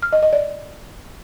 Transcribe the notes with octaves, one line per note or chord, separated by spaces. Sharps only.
F6
D#5
D#5
D5